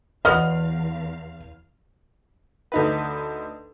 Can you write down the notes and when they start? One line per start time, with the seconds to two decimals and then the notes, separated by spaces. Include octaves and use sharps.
0.25 E2 F#3 B3 D#5 F5 F6
2.72 D2 D#4 B4